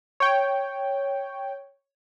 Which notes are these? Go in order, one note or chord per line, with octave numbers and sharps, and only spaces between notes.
C#5 G5